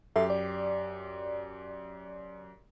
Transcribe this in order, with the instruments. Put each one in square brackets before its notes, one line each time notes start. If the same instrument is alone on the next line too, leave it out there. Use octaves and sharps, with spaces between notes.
[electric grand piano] F#2 G4 C7 [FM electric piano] A4 E5
[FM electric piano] D5